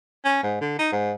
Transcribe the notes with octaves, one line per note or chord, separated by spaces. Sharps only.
C#4
G#2
D3
D#4
G#2